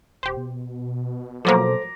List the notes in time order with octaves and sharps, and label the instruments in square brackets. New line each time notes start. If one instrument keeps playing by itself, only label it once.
[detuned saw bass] D#1 [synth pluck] G4 C5
[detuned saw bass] B2
[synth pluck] F3 F#3 A#3 [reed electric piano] A4 C5 [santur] A#5 D6